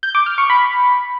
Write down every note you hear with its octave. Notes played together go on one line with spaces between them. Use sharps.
G6
D6
F6
C#6
B5